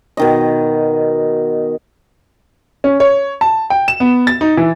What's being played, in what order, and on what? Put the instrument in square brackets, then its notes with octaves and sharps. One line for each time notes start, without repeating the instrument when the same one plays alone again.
[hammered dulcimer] B2 D#3 D#5
[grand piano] C#4
C#5
A5
G5
E7
B3
A6
D#4
E3